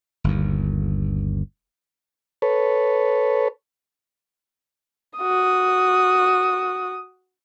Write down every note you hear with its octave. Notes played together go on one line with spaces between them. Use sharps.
G1 D#2
A4 B4 C#5
F#4 D#6